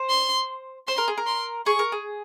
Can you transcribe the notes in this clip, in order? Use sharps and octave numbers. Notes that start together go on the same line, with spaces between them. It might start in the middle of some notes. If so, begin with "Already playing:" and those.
Already playing: C5
C6
C5 C6
A#4
G#4
A#4
C6
G#4 C#6
A#4
G#4